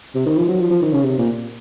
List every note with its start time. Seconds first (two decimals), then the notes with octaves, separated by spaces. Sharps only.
0.15 C3
0.26 D#3
0.37 F3
0.48 F#3
0.59 F3
0.70 F3
0.81 D#3
0.92 C#3
1.03 C3
1.18 A#2